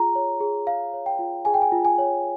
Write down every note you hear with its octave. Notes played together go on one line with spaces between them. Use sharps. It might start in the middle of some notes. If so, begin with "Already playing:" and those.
Already playing: F4 G#4 A#5
C#5
G#4
G#4 F5
C#5
G5
F4
G#4 G#5
G5
G#5
F4
G#5
C#5